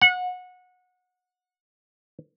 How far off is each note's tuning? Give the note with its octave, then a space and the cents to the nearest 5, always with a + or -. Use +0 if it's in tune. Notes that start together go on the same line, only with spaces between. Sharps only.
F#5 -25